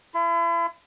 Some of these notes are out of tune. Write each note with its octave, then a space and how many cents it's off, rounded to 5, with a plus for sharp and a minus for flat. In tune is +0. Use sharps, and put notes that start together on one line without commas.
E4 +40